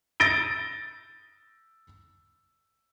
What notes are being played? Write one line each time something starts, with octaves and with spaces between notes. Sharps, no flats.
E6 A6 A#6 D7 G7